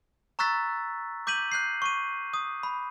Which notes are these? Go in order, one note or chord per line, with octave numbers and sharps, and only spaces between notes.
A#5 C#6 E6 F#6 A6 B6
D6 G6 B6 D#7 F#7
F#6 G6 C7
C#6 D#7
D#6
B5